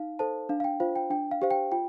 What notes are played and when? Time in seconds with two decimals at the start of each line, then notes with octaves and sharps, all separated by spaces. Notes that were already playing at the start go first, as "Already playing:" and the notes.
Already playing: D#4 F5
0.19 A4 C5 A5
0.49 D4 F5
0.60 F5
0.64 G5
0.80 F4 C5 F5
0.96 G5
1.10 D4 G5
1.31 F5
1.42 G4 C5 F5
1.51 G5
1.72 F4 G5